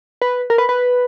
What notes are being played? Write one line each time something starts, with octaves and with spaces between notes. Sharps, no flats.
B4
A#4
B4
B4